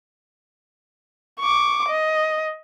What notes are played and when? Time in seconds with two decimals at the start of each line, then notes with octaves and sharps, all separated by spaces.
1.40 C#6 D6
1.89 D#5